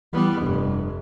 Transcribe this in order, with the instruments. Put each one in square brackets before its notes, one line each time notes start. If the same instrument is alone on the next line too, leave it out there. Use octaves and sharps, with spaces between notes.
[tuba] E3 [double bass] G3 B3
[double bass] F1 [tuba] G2